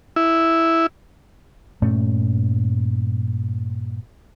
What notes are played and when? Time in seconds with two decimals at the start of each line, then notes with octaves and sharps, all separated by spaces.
0.16 E4
1.82 G2 A#2 A3 C#4